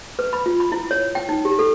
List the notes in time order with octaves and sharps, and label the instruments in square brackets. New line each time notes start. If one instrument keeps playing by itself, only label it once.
[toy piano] B4
B5
F4
B5
E4
C#5
G5
D#4
G4
A4